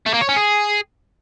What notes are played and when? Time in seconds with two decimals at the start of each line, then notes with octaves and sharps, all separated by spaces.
0.06 A3
0.14 A#3
0.21 C#5
0.29 C#4
0.36 G#4